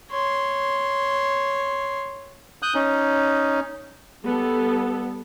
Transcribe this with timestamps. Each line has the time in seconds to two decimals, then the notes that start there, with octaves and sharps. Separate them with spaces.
0.10 C#5 C6
2.62 D#6 F#6 G6
2.75 C#4 D#4
4.24 G3 B3 A4